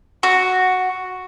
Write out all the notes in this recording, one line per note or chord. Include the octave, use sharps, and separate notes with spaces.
F#4